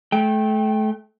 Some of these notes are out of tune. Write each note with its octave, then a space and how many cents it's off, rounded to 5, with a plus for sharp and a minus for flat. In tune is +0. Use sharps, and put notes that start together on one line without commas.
A3 -30 G5 +0